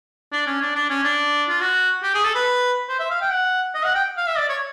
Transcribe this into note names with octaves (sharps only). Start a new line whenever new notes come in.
D4
C#4
D4
D4
C#4
D4
F4
F#4
G4
G#4
A4
B4
C5
E5
F5
G5
F#5
D#5
F#5
G5
F5
E5
D5
C#5